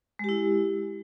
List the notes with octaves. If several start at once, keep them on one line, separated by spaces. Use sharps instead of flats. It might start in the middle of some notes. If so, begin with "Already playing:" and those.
G#3 E4 G4